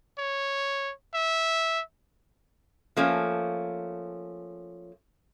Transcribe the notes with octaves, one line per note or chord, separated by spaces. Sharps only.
C#5
E5
F3 A3 A#3 C#4